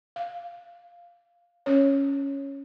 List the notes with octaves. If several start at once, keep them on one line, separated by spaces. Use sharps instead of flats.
F5
C#4 C#5